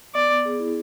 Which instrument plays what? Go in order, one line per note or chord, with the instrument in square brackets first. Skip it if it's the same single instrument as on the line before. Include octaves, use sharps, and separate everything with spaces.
[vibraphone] B3 [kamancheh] D5
[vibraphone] B3
G#4
E4